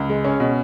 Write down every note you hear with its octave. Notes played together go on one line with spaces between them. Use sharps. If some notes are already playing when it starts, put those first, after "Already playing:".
Already playing: C#2
G#3
C#4
B2